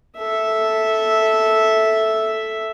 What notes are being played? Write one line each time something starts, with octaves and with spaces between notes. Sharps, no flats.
A4 E5